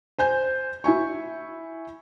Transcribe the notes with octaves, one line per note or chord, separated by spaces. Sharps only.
C5 G#5 G6
E4 E5 G#5 C#6